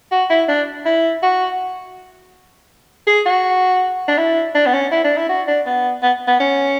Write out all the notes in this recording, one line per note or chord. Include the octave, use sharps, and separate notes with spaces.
F#4
E4
D4
E4
F#4
G#4
F#4
D4
E4
D4
B3
C#4
E4
D4
E4
F#4
D4
B3
B3
B3
C#4